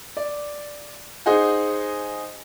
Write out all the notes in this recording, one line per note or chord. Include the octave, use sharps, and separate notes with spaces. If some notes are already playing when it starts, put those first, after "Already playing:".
D5
D#4 G#4 C5 D#5 F#5 G#5